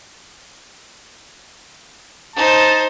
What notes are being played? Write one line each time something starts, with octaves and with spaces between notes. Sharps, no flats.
D#4 C5 A5